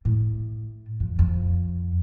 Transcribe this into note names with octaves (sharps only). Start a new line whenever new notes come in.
A2
F2
F2